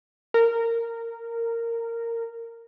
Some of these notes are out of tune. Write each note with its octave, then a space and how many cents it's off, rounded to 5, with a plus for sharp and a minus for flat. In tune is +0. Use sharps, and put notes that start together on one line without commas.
A#4 -15